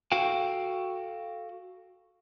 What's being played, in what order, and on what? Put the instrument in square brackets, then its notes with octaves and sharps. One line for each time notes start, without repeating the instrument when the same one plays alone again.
[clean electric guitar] F#4 A4 F5 G5